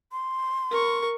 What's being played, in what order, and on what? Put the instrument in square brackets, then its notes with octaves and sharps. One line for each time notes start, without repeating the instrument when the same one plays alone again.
[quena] C6
[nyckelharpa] A#4 C#6